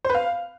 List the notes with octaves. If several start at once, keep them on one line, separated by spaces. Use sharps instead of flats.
C5
B4
F5